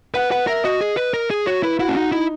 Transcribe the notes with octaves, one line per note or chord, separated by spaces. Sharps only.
B4 F#5
B4 F#5
A#4 E5
F#4 D#5
G#4
B4
A#4
G#4
F#4 C#5
E4 B4
E4 F#4
C#4
D#4 F#4
D#4 E4